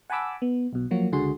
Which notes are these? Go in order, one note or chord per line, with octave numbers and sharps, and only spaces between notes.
F#5 G#5 A5 B5 D6 E6
B3
B1 B2
F3 F#3 A#3 F#4
C#2 D3 F#4 G#4 C6